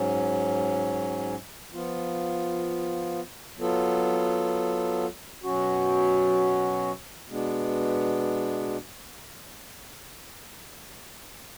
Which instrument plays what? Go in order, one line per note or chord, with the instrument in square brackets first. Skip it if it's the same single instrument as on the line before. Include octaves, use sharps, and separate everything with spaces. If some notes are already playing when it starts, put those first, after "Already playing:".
Already playing: [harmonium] G#2 F#3 C#4
F3 B3 F4
F#3 B3 F4 A4
B2 F#3 C#4 F#4
B2 G#3 B3 D4